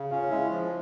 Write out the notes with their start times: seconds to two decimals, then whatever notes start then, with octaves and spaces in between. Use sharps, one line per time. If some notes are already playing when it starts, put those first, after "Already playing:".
Already playing: C#3
0.11 C#4 F4 F5
0.21 C#5
0.31 G#3 E4 E5
0.51 F3